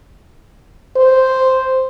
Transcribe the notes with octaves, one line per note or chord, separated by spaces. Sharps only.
C5